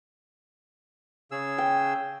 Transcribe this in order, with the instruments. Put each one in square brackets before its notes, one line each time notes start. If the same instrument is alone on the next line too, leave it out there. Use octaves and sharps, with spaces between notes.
[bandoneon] C#3 G#4 E6
[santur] G5